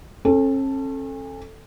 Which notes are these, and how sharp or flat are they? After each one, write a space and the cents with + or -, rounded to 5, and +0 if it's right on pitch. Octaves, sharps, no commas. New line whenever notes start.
C#4 -45 A4 +0